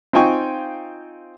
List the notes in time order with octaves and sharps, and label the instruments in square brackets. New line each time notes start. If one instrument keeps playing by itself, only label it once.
[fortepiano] C4 D#4 F4 G5 G#5 C#6